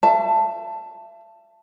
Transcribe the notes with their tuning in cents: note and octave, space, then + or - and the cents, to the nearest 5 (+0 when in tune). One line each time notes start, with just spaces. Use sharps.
E5 +40 A5 +5